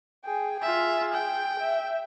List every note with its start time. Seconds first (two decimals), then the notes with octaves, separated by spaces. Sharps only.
0.25 G#4 G5
0.62 F4 G#4 E5
1.13 G5
1.60 E5